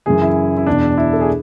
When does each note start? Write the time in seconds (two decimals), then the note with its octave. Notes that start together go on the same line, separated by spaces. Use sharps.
0.06 F#2 C#3 E3 G#4
0.22 E4
0.57 E4
0.66 E2 B2 D4
0.98 E4
1.13 A4
1.21 G#4